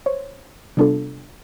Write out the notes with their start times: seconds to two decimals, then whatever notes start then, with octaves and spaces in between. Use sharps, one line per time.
0.06 C5 C#5
0.77 C3 G3 B3 D4 F4 A4